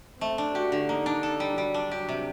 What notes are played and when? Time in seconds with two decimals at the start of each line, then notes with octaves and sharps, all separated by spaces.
0.21 A3 C4
0.38 D4
0.55 F#4 G4
0.72 D3
0.89 A#3 D#4
1.06 D4
1.23 A4
1.40 G3
1.57 F#3 G3
1.74 D4
1.91 F#3 G4
2.09 C3